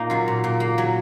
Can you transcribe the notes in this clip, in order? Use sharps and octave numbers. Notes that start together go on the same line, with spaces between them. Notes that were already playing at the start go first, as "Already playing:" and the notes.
Already playing: A#2 A#3 D#4
F#3 F4
A#2
A#2
A#3
F#3